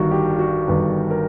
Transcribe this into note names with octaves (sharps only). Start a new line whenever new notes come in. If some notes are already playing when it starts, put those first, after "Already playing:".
Already playing: G1 G2 D#3 F#4
G4
F#4
G1 G2 D#3 B4
A#4